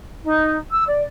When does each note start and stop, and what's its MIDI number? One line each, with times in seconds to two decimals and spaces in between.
0.23 0.56 63
0.70 0.83 88
0.86 1.01 74